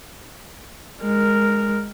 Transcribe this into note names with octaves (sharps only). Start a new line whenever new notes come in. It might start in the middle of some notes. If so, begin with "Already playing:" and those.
G#3 A#4